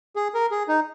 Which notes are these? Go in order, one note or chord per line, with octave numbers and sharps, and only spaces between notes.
G#4
A#4
G#4
D#4